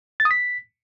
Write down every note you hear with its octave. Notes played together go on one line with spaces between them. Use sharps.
A6
D#6
B6